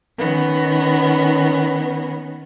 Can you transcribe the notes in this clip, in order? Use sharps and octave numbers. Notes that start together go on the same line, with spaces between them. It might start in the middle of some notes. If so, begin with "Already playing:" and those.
D#3 B3 C#4